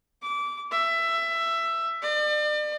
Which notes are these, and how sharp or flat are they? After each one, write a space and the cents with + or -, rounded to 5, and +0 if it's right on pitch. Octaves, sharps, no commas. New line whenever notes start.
D6 -20
E5 +15
D5 +40